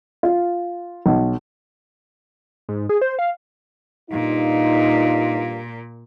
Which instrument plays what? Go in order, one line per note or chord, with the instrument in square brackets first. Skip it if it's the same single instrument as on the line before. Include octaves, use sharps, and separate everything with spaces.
[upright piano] F4
B1
[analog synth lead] G#2
G#4
C5
F5
[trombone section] G2 F4 [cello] A#2 [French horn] D#4